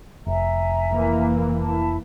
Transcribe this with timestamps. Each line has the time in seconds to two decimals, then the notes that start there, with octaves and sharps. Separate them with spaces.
0.26 F1 E5 G#5 A#5
0.92 E3 A#3
1.60 E4 A5